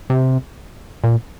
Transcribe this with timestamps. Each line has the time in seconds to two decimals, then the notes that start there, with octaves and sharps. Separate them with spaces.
0.10 C3
1.04 A#2